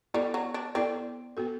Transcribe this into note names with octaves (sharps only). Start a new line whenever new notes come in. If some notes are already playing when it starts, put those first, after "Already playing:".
G3 B3 E4 A4 D5
F#3
D4
B3 C4 E4 A4 D5
B3 F#4 A4